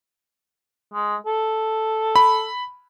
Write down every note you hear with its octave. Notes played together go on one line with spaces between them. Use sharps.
G#3
A4
B5